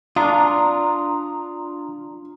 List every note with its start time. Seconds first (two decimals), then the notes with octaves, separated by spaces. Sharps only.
0.16 D4 F4 A#5 C6 D#6